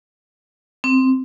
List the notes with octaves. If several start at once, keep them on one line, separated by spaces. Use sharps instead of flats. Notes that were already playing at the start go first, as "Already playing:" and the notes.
C4